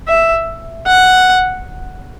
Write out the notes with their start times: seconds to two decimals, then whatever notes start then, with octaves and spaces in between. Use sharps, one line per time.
0.08 E5
0.86 F#5